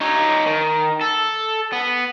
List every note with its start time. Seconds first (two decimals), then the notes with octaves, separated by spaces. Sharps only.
0.01 D#4 C#5
0.46 D#3
1.01 A4
1.73 B3